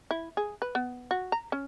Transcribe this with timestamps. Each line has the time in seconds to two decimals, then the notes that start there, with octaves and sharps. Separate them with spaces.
0.11 E4
0.37 G#4
0.62 B4
0.75 B3
1.11 F#4
1.32 A#5
1.52 C#4